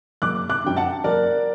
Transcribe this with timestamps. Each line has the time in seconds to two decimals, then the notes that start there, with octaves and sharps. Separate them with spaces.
0.22 F#1 D6 F#6
0.50 D6 F#6
0.64 F#2 D3 G5
0.77 F#5 A5
1.04 F#1 A#4 D5